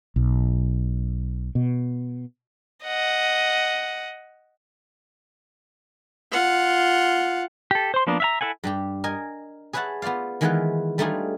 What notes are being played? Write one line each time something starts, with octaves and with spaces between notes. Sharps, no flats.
B1
B2
D#5 F#5
F4 F#5
G4 A4
C5 C6
F3 A#3 B3 D4 A#4
E5 F5 A#5
E4 A4 F#5 G#5
G2 G3 G4
A#4 D#5 G#5
G#4 B4 C#5 E5 F#5 A5
B3 F4 C5 D5 F5
D#3 E3 G#3 B3 F4 B4
G3 A3 D4 D#4 F4 G#4